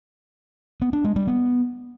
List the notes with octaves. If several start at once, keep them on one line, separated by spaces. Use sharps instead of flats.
B3
D4
G#3
G3
B3